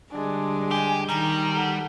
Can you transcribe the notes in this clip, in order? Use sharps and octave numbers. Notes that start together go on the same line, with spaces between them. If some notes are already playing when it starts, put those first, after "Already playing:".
D3 G3 G#3 D4
G4 G#5
D#3 G3 A#5
A4 F#5